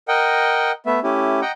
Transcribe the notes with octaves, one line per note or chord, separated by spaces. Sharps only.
A#4 D#5 F#5 G5
A3 B3 E5
A3 C#4 E4 G4
D#5 F#5 G5 A#5